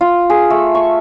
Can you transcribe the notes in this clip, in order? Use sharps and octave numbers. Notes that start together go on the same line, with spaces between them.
F4
G#4
A3
C#6